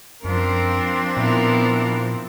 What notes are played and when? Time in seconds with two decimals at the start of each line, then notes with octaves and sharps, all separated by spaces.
0.25 F#2 F3 C4 D4 A#4
1.17 A#2 B3 E4 A#4